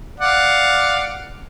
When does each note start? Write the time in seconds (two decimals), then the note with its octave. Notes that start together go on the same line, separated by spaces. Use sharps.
0.20 D5 F5 F#5